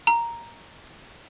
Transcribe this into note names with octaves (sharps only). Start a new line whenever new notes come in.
A#5